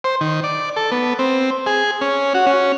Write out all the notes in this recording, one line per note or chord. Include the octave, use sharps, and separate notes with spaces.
C5
D#3
D5
A4
B3
C4
G#4
C#4
F#4
C#4